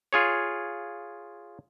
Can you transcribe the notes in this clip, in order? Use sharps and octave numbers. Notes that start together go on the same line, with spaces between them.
F4 G#4 C#5